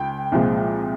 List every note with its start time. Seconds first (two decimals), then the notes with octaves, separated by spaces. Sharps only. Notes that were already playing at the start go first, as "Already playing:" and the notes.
Already playing: C#2 G5
0.32 C2 A#2 F3 G#3